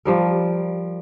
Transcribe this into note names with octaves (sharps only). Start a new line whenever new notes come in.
F3 G3 A#4